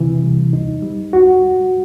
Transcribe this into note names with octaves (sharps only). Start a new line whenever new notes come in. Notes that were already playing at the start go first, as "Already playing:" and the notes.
Already playing: C3 E3
G3
D#4
G3
F#4